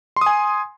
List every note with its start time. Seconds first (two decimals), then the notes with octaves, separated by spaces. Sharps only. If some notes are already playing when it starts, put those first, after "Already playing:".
0.16 C6
0.21 D#6
0.26 G#5